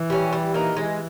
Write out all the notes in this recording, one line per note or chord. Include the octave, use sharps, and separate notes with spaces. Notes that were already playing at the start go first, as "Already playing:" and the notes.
Already playing: E3
G3 C#4
G3
A#3 D#4
E3 G#3